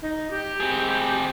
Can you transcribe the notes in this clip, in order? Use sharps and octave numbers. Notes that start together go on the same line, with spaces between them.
D#4
G4
C4 G#4